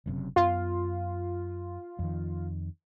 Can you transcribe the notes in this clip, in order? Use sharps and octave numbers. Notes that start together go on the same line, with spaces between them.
F#1 F#2 C3
F#2 B3 F4
F2 D#3